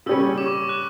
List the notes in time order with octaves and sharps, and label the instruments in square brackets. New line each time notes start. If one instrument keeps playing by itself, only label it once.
[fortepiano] C#3 G3 C#4 [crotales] E6
[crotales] D6
C#6
D6
F#6